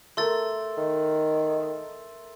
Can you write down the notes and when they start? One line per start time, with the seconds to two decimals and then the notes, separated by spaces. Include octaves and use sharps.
0.17 A3 A#4 C6 E6 A6
0.77 D#3